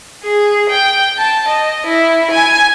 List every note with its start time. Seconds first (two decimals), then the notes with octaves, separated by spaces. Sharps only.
0.23 G#4
0.70 G5
1.18 A5
1.49 D#5
1.87 E4
2.32 G#5